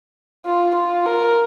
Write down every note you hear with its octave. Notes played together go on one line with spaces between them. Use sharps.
F4
F4
A#4